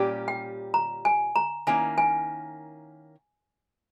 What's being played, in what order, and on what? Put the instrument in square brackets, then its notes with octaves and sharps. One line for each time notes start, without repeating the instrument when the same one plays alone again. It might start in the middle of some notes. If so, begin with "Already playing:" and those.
Already playing: [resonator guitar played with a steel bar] A#2 G3 C#4 G4
[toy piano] G5
A#5
G#5
A#5
[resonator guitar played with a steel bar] D#3 A#3 C#4 E4 [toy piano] G#5
[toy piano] G#5